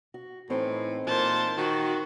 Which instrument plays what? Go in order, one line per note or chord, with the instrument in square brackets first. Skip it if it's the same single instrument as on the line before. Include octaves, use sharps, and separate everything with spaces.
[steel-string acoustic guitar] F#4
[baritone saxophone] A2 [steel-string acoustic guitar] E3 C4 D#4
[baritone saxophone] A#2 [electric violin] C5 A5
[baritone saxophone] D#3 [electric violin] F#4